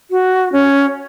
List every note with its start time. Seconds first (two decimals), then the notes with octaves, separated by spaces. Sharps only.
0.11 F#4
0.52 C#4